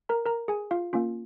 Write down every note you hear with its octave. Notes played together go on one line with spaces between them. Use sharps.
A#4 A#5
A#4 A#5
G#4 G#5
F4 F5
A#3 C#4 F4